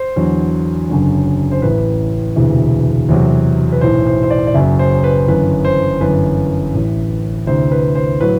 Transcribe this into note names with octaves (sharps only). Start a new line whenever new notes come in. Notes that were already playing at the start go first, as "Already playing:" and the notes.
Already playing: C5
E2 D3 F#3
F#1 F#2 D3 F#3
C5
A1 A2 E3 B4
E1 D2 C3 E3
E2 C3 F#3
B4
B1 A2 E3 C5
C5
C5
D5
D5
F#1 F#2 F#3 E5
C5
B4
G1 F#2 E3 B4
C5
G1 F#2 E3 B4
A1 A2 E3
D2 C3 E3 C5
B4
C5
A2 F#3 B4